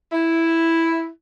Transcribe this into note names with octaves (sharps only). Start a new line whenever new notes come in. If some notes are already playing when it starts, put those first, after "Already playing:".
E4